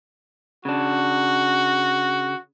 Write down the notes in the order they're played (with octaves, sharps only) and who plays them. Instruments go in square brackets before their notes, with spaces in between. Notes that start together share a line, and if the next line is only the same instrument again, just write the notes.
[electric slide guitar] C#3 D4 [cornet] F#4